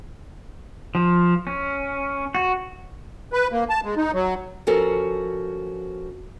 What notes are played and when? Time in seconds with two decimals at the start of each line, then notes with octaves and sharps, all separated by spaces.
0.95 F3
1.47 C#4
2.35 F#4
3.33 B4
3.52 A#3
3.70 A5
3.84 G#3
3.97 D#4
4.13 F#3
4.67 F3 C#4 F#4 A4 A#4